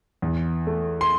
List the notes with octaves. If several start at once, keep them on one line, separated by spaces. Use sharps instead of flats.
E2
A3
C6